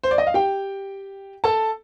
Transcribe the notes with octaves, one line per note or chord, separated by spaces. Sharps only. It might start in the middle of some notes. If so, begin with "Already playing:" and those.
C5
D5
D#5
F5
G4 G5
A4 A5